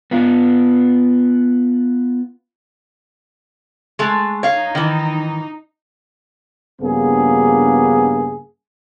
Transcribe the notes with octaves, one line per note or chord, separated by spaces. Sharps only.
B3 F4
G#3 A3
D#4 C#5 F5
D#3 E3
A#1 G2 C#3 A#3 B3 G#4